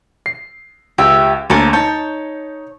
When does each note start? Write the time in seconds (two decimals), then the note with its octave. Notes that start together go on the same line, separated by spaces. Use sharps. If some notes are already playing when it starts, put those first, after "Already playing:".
0.26 C7
0.98 C#2 G4 E5 G5
1.50 D2 A#3 A4 A#4 C#5
1.73 D#4 C#5 A5 G6